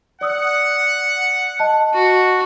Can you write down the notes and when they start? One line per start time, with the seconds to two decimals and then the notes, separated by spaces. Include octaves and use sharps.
0.21 D5 F#5 D#6 E6
1.60 D#5 A5
1.94 F#4